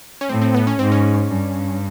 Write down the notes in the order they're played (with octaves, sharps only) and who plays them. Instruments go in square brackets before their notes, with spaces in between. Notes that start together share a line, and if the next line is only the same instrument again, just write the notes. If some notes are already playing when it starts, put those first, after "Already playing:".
[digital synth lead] C#4
[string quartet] A2 [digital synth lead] C4
[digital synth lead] C4
B3
C#4
[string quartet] G#2 [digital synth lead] C4
[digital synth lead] C#4
[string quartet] G2